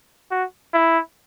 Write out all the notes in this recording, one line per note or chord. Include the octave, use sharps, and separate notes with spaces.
F#4
E4